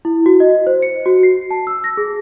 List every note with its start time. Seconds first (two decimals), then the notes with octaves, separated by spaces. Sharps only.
0.05 E4
0.26 F#4
0.40 D#5
0.67 C5
0.82 C#7
1.06 F#4
1.23 C7
1.51 A5
1.67 E6
1.84 A#6
1.97 G#4